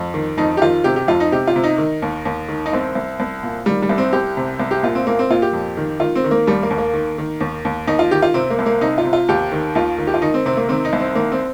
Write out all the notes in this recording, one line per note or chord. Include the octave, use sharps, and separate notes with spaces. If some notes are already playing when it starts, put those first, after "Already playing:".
Already playing: F2
D#3
F2 D#4
G4
D#3 F4
C3 G4
G4
F2 F4
D#4
C3 G4
F4
C3
D#4
D#3
D#2
D#2
D#3
D#4
C2 C4
C2
C2
A#2
D#3 G3
G3
C2
C4
C2 G4
C3
C2
G4
A#2 F4
C4
A#2 A#3
C4
A#2 F4
G4
F2
D#3
D#3 F4
C4
D#3
A#3
D#2 G3
A#3
D#2
A#3
D#3
D#3
D#2
D#2
D#2 D#4
F4
D#3 G4
F4
C3 C4
A#3
C2
A#3
C3 D#4
F4
C3
F4
D#2 G4
D#3
D#2 F4
D#3
G4
F4
D#3 D#4
C4
C3 C4
A#3
D#3 C4
D#4
C2
C4
D#3 A#3
C4